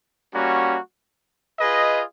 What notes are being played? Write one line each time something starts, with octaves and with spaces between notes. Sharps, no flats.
G3 A#3 C#4 F#4
F4 G#4 B4 D#5